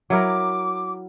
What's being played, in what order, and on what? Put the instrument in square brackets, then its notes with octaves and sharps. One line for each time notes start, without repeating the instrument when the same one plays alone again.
[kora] F#3 E4 A#4 [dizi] D6